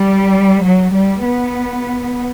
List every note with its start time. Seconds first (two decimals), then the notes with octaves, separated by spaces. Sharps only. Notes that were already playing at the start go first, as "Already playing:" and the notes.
Already playing: G3
0.64 F#3
0.94 G3
1.25 B3